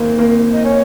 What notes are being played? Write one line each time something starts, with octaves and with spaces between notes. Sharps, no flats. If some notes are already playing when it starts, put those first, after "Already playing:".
Already playing: G#1 A#3
A#3
D#4
C#4